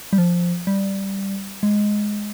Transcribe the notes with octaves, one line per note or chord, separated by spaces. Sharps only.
G3
F3
G3
G#3